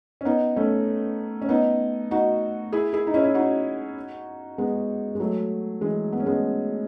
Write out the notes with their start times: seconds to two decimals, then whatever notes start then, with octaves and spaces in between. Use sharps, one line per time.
0.21 C#4
0.25 B3 D#4
0.56 A3 C#4
1.41 C#4
1.49 B3 D#4
2.11 D#4 F#4
2.73 E4 G#4
2.93 E4 G#4
3.07 D#4
3.14 C#4 E4
3.24 E4
3.34 D#4 F#4
4.58 G#3 B3
5.15 G#3
5.20 F#3 A3
5.81 E3 G#3
6.13 B3
6.20 C#4
6.26 G#3 B3